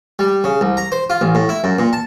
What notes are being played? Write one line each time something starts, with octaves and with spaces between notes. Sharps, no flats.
G3
C#3
C2
A#5
C5
F4
A1
A2
E4
F#2
A#2
A5